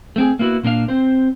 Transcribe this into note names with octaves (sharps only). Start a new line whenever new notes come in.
A3 C4 G#4
A#3 B3 E4 F#4
A#2 A#3 D4 F5
C4 C5